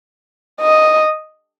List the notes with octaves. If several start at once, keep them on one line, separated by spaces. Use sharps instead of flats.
D#5